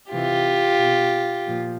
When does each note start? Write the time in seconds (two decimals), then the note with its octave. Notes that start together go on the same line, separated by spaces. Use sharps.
0.12 C3 E3 F4 G4
0.79 B2
1.46 A#2 F3